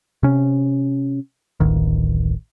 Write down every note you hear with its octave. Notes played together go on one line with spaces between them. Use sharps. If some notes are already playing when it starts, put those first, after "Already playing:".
C3 C#4
D1 A1 D#3